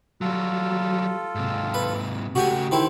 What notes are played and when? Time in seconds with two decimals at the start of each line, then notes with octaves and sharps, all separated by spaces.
0.21 F#3 G3 F4 A4
1.35 G#2 C3
1.74 B4
2.35 C#3 A3 F#4 G4 G#5
2.71 D#3 C4 E4